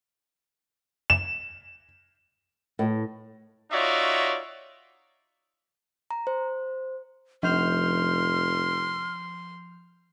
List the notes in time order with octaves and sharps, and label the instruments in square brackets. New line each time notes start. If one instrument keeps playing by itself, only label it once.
[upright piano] E7
[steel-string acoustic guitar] A2
[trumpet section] D#4 F4 F#4 C#5 D5 E5
[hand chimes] A#5
C5
[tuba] F1 [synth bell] F3 G6 F7 [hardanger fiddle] C6 [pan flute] F6